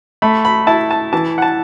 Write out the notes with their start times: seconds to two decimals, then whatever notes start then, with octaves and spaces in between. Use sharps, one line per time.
0.22 A3 B5
0.45 B5
0.67 E4 A5
0.91 A5
1.13 E3 A5
1.38 F#5
1.42 A5